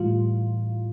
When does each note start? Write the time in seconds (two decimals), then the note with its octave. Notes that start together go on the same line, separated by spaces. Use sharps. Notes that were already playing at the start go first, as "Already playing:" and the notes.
Already playing: A2 E3 G3 F4